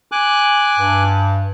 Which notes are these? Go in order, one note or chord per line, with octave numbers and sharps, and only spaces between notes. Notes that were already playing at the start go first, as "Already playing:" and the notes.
G#5 D6 F#6
G2